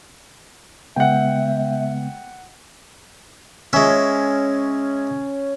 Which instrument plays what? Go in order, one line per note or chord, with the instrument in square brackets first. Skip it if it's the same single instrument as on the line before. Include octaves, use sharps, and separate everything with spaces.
[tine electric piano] C#3 G#3 B3 [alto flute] E5 [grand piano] F#5 G5
[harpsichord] G#3 E5 [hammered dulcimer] C#4